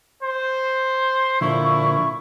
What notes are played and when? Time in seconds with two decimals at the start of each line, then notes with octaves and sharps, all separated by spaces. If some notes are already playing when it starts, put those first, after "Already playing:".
0.23 C5
1.41 A#2 D3 F3 E4 C#6